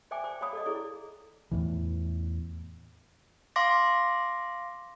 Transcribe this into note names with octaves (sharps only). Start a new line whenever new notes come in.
C5 D5 E5 G5 G#5 D6
C5 D6
C#5 D5 F5 B5 D#6
A4 D5 D#5
E4 G#4 C#5 D5
E2 A2 E3
F5 C6 D6 A#6